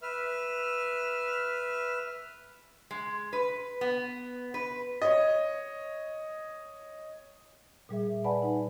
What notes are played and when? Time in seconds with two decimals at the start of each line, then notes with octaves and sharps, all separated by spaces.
0.02 B4 E5 F6
2.91 G#3
3.33 B4
3.81 B3
4.54 B4
5.02 C#5 D#5
7.89 A#2 G3 G#4 E5
8.24 B4 D5 F#5 G#5 A5 B5
8.42 D#4